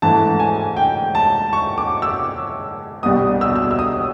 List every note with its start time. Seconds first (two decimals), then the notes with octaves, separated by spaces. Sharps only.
0.02 G#2 E3 A3 A5
0.40 G#5
0.77 G5
1.15 A5
1.53 C#6
1.78 D6
2.02 E6
3.03 C2 B2 G3 D#6
3.41 E6
3.56 E6
3.71 E6
3.79 D#6